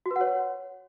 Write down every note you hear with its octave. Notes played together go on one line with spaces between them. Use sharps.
F#4
B4
F#5
C#5